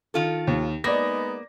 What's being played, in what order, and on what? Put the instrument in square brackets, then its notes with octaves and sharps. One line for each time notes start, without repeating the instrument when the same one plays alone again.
[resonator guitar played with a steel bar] D#3 F4 A4
[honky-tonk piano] D#2
[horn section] G#3 B3 D#4 [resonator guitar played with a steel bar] A#3 [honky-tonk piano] D5 A#6